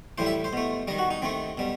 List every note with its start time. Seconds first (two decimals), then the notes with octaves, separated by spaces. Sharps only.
0.18 A2 E3 G3 C5
0.26 E5
0.44 C5
0.53 B2 A3
0.88 D#3 G3 D#5
0.99 F#4
1.11 D#4
1.22 D#3 A3 C4
1.57 B2 G3